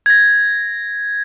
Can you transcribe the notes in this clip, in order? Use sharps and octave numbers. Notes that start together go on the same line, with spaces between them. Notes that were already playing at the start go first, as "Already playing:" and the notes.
G#6 A#6